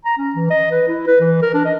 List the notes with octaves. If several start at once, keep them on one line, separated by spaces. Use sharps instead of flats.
A#5
C#4
E3
D#5
B4
E4
B4
E3
A#4
D4
D#5